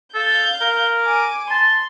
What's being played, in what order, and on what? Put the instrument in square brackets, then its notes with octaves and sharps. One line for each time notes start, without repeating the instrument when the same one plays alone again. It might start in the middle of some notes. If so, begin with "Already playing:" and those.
[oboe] A4 [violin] F5 G6
[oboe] A#4
[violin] G#5 D6
[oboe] A5 [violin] C6